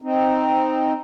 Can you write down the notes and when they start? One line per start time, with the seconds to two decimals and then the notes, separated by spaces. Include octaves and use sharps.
0.02 C4 D#4